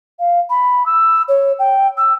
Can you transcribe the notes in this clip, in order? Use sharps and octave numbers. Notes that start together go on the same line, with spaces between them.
F5
B5
E6
C#5
G5
E6